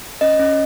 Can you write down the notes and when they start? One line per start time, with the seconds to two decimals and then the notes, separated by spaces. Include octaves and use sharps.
0.21 C#4 D#5
0.39 C#4